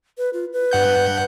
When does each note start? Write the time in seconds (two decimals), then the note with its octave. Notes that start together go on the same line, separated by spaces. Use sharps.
0.18 B4
0.33 F4
0.53 B4
0.71 G2 F#5 G6